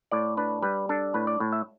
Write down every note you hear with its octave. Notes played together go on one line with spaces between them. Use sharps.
A2 D5
D4 B4
G3 B4
D4 A4
A2 B4
D5
A2
E5